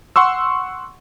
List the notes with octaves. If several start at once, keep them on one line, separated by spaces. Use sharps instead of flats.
F#5 C6 C#6 E6